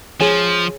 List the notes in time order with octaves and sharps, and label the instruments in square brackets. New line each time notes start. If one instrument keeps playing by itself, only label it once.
[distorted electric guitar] F3 [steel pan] G#4 C#5 G#5